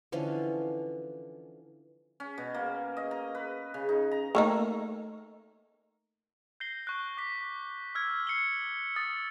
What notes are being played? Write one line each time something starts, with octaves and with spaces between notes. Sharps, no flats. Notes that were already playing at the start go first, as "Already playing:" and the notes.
D3 E3 F3 C#4
C#4
B2
A#3
D#5
A#5
B4
C#3
D#4
A#5
A3 A#3 D#4
G6 A#6 C7 G7
C#6 F#6
D6 B6
E6 F6 G#6
C7 C#7 F#7 G7
D#6 A6